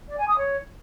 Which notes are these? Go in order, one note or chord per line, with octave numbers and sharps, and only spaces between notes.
D5
G#5
D#6
C#5